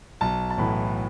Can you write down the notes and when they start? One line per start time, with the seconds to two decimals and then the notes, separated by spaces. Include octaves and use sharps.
0.21 B1 A5
0.50 A5
0.57 A2 E3 B3 B5